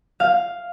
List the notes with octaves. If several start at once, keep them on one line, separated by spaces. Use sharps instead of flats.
F5